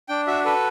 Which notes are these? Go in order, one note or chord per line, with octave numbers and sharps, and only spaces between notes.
D4 G5
F#4 E5
A4 B4